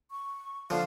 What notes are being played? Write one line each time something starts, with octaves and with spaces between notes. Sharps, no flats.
C#6
D3 F3 F5